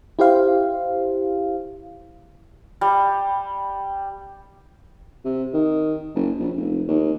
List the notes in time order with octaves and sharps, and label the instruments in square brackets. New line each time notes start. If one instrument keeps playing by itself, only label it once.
[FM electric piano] E4 G4 C5 F5
[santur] G3
[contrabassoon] C3
D#3
F#1
A#1
F1
D#2